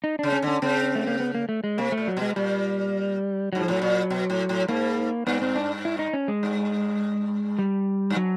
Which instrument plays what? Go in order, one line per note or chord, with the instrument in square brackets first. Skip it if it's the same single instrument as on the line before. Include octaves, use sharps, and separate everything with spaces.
[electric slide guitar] D#4
[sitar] C#3 [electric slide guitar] D4
[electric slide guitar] C#4
[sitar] D3 [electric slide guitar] C#4
[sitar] C#3 [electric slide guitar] C4
[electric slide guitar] A3
A#3
B3
A#3
A3
G#3
[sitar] C3 [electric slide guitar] A#3
[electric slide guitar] A3
[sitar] A#2
[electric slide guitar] F#3
[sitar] B2 [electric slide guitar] G#3
[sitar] A#2 [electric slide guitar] G3
[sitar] G#2 [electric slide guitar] F#3
[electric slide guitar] F3
[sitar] A2 [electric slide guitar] F#3
[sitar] A#2
B2
A2
A2
[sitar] G#2 [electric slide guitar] A#3
[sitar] G2 [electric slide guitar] B3
[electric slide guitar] C4
D4
E4
D#4
C#4
G#3
[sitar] G2
[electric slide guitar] G3
[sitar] G2
[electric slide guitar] F#3